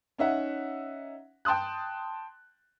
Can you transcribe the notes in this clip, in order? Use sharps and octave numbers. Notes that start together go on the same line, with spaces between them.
C#4 D#4 E5 F#5
G5 A5 C6 D#6 F#6